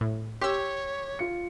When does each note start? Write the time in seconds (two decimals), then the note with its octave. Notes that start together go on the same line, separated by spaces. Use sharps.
0.01 A2
0.41 G4 C#5 C6 E6
1.19 F4 C#7